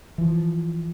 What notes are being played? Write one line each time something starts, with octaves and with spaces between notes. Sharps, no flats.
E3 F3